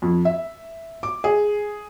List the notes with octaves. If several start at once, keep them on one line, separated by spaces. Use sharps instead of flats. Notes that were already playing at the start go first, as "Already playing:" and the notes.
F2
E5
D6
G#4